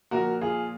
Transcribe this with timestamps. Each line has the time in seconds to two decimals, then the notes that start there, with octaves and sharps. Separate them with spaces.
0.11 A#2 F3 F#4 A#4
0.41 F4 G#4